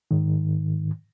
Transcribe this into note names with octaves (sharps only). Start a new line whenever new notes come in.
G#2 D#3